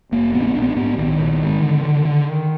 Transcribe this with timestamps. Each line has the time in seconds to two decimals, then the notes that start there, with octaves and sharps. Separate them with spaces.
0.12 F1 A#3
0.34 A#1 B3
0.41 D4
0.47 B3
0.55 A#1 D4
0.62 B3
0.69 D4
0.76 G#2 B3
0.98 A#1 D#3
1.19 A#1
1.41 G#2
1.62 D3
1.84 D3
2.05 D3